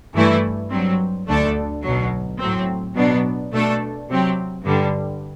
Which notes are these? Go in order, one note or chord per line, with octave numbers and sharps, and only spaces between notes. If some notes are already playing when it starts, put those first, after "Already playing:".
G2 E3 A3 E4
G2 F#3 C4
D2 D3 A3 D4 A4
B1 B2 F#3
A2 F#3 C4
B2 F#3 B3 D4
B2 A3 D4 A4
C3 F#3 C4 G4
G2 D3 G3